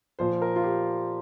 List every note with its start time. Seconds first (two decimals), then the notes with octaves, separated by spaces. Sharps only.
0.19 A#2 F3 C5
0.32 C5
0.42 A#4
0.56 F4
0.64 G4